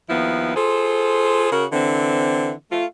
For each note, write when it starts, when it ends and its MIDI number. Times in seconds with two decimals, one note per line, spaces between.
0.09 0.54 39
0.09 0.54 53
0.09 0.54 59
0.09 0.54 64
0.55 1.49 65
0.55 1.49 68
0.55 1.49 69
0.55 1.49 72
1.51 1.64 49
1.51 1.64 66
1.51 1.64 70
1.71 2.52 50
1.71 2.52 52
1.71 2.52 60
2.71 2.84 57
2.71 2.84 65